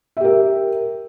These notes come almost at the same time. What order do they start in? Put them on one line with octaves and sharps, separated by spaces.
E5 G4 A#4